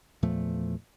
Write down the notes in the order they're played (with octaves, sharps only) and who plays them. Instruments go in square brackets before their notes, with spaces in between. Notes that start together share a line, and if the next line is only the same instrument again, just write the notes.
[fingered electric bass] E2 A#2 F3 A3